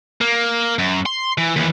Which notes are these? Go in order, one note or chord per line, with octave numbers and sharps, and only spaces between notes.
A#3
F#2
C6
E3
D#2 E3